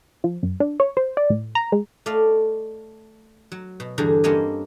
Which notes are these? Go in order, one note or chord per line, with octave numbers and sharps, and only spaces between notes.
F3
F#2
D4
C#5
C5
D5
A2
A#5
G#3
A3 D5 D#5 F5
F#3
B2
E2 G2 D3 G3 G#4 A#5
G2 A#3 C4 C#4 C#5 D#5